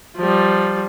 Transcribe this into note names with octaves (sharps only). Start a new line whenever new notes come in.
F3 G3